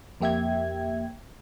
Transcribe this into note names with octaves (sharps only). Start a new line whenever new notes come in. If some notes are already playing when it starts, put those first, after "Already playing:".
F2 A#3 G4 E5 G5 G#6